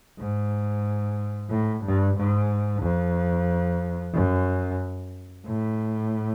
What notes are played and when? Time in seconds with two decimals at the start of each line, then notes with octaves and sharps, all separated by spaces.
0.18 G#2
1.50 A2
1.84 G2
2.17 G#2
2.82 F2
4.13 F#2
5.46 A2